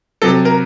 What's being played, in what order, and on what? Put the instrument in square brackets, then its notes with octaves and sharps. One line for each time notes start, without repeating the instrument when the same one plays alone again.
[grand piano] C3 F#3 A4
A#4